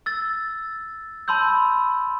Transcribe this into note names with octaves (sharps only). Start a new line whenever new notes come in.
E6 A6
A5 B5 C6 E6 G6